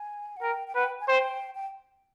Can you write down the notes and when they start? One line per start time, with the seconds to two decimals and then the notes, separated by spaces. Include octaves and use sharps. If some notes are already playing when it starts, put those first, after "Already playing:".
Already playing: G#5
0.37 F#5
0.42 A#4 G5
0.67 G5
0.75 B4 F#5
0.84 G5
1.00 G#5
1.08 C5 G5
1.54 G5